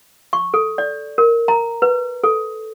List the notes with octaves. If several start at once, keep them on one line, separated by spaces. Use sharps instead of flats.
C#6
A4
D5
A#4
A#5
B4
A4